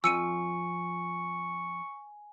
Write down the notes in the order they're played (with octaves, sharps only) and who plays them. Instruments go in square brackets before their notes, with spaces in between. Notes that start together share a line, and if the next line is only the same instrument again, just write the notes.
[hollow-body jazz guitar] F2 F3 [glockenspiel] G#5 [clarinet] C#6 [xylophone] E6 C#7 D#7